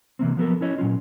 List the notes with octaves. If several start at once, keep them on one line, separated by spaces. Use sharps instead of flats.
C3 E3 A#3 C4
F3 F#3 B3 F#4 A4 A#4
C#4 E4 C#5 D#5
A#2 F#3 C#4 F4